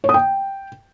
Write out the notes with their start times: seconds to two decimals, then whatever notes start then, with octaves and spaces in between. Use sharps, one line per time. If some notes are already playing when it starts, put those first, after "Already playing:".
0.04 C#5
0.09 D#6
0.14 G5